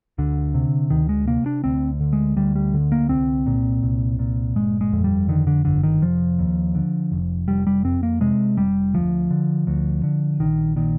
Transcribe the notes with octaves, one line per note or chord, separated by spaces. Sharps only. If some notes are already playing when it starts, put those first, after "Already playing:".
D2 D3
C3
D2 D#3
G#3
C3 A#3
D4
D2 C4
D3
G#3
D2 G3
G3
D3
A#3
C2 C4
A#2
C2
A#2
G1 G#3
G#3
F2
G3
D3 D#3
D3
G1 D3
D#3
F1 F3
D#2
D3
F1
F1 G3
G3
F2 C4
A#3
C3 G#3
F1 G3
D2 F3
D3
D2
D3
A#1 D#3
A#2 D#3